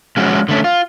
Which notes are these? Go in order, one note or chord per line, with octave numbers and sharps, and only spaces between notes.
F3 G#3 C#4 F#4
D3 A3 C#4
F4